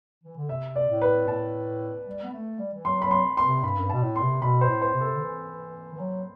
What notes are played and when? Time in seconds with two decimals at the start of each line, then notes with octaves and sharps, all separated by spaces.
0.24 E3
0.37 D3
0.49 C3 E5
0.76 D5
0.88 A2
1.02 B4
1.28 A2 A5
2.07 G3
2.23 B3
2.32 A3
2.59 G3
2.74 E3
2.85 F#3 C6
3.02 F#3 B5
3.11 C6
3.37 C6
3.44 C3
3.63 G2 B5
3.78 F#2
3.83 G2
3.90 B2 A5
4.03 A2
4.16 C6
4.22 C3
4.42 B2 B5
4.61 C5
4.68 A2
4.82 C5
4.94 C3
5.01 A4
5.15 D3
5.21 E3
5.94 E3
5.99 F#3